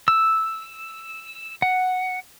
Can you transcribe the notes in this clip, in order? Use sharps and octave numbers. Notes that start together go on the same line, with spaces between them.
E6
F#5